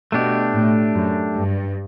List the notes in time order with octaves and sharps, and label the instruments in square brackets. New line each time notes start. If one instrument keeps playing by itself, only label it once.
[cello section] B2 [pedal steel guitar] A3 D4 G4
[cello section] A2
F#2
G2